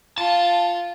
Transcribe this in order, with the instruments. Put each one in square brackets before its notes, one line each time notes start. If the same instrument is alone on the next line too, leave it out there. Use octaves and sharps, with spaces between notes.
[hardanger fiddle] F4 [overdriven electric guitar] A5